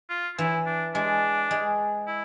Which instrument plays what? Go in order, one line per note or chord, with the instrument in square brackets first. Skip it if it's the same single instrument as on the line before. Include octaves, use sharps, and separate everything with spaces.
[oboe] F4
[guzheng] E3 [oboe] E4
[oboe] D4
[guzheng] G#3 [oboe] D4
[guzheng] G#3
[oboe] E4